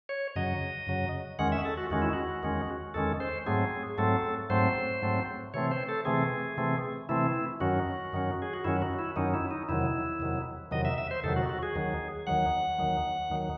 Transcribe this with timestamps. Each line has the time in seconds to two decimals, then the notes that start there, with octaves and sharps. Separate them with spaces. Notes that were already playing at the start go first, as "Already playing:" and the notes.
0.09 C#5
0.36 F#2 C#3 F#3 D#5
0.87 F#2 C#3 F#3
1.39 E2 D#3 G#3 C#4 F#5
1.52 E5
1.65 A4
1.77 F#4
1.90 E2 D#3 G#3 C#4 F#4
2.02 E4
2.13 F#4
2.43 E2 D#3 G#3 C#4
2.94 E2 D#3 G#3 C#4 A4
3.20 C5
3.46 G#2 F#3 A3 C4 G#4
3.98 G#2 F#3 A3 C4 A4
4.50 G#2 F#3 A3 C4 C5
5.02 G#2 F#3 A3 C4
5.54 C3 E3 A3 C4 C#5
5.71 C5
5.89 A4
6.05 C3 E3 A3 C4 G#4
6.57 C3 E3 A3 C4
7.09 C3 E3 A3 C4 E4
7.60 F#2 D#3 F#3 C#4 F#4
8.13 F#2 D#3 F#3 C#4
8.42 G#4
8.53 F#4
8.64 F#2 D#3 F#3 C#4 E4
8.82 F#4
8.99 E4
9.16 F#2 D#3 F#3 C#4 D#4
9.34 E4
9.51 D#4
9.69 E2 C3 D#3 F#3 E4
10.20 E2 C3 D#3 F#3
10.71 E2 C3 D#3 F#3 D#5
10.85 E5
10.98 E5
11.11 C5
11.24 E2 C3 D#3 F#3 A4
11.36 F#4
11.49 F#4
11.63 G#4
11.75 D#2 D#3 F#3
12.27 D#2 D#3 F#3 F#5
12.79 D#2 D#3 F#3
13.30 D#2 D#3 F#3